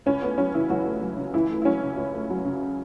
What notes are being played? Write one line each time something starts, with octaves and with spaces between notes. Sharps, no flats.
C#2 C#4
A3 B3
F#3 C#4
C#3 E3 E4
C#2 F#3 F#4
A3
F#3
C#3
C#2 E3 E4
A3
E4
F#3 C#4
C#3
C#2
A3
F#3
C#3